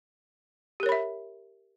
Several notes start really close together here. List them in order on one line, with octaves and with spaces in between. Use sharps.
G4 A#4 C#5 B5 E5